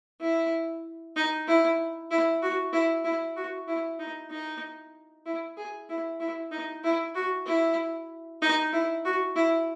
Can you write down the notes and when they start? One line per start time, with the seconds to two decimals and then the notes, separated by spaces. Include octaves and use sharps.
0.21 E4
1.16 D#4
1.48 E4
2.11 E4
2.42 F#4
2.73 E4
3.05 E4
3.36 F#4
3.68 E4
3.99 D#4
4.31 D#4
5.26 E4
5.57 G#4
5.89 E4
6.20 E4
6.51 D#4
6.84 E4
7.15 F#4
7.46 E4
8.42 D#4
8.73 E4
9.05 F#4
9.36 E4